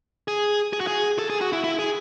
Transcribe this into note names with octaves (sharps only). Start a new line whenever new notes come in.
G#4
G#4
F#4
G#4
A4
G#4
F#4
E4
E4
G#4